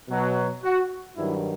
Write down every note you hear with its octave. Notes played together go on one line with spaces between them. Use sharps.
B2 F#3
F#4
G2 D#3 F#3 E4